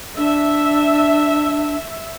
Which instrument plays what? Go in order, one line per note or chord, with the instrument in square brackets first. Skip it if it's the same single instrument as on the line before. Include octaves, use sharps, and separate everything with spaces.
[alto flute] D4 [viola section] E5